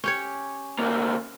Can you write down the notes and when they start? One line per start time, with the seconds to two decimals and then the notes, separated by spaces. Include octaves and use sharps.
0.04 C#4 G4 C#5
0.79 D2 A#3